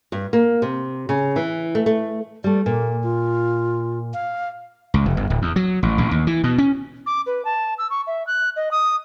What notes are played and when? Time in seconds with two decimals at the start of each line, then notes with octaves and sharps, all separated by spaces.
0.12 G2
0.33 A#3
0.62 C3
1.09 C#3
1.36 E3
1.75 A3
1.86 A3
2.44 G3 A3 D5
2.66 A#2 A#3
3.03 F4
4.14 F5
4.94 C#2
5.06 F1
5.17 G1
5.30 D1
5.42 E2
5.56 F#3
5.83 A1
5.98 A1
6.11 D#2
6.27 E3
6.44 B2
6.58 C#4
7.06 D6
7.27 B4
7.45 A5
7.78 E6
7.90 C#6
8.07 E5
8.27 F#6
8.56 D#5
8.71 D#6